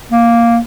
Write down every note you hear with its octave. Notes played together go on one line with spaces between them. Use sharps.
A#3